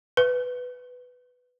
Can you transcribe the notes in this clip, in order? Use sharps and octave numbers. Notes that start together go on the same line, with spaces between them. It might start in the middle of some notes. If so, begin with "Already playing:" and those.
B4